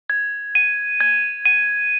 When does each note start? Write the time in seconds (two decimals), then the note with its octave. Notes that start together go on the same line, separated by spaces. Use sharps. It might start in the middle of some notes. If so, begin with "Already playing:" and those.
0.10 G#6
0.55 D#7
1.01 G#6
1.46 D#7